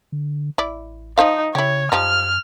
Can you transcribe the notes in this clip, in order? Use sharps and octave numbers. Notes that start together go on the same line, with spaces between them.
D3
A1 E4 D5
F3 D#4 C5 F5
C#3 E4 G4 C#5
F#2 F3 G3 D#4 F6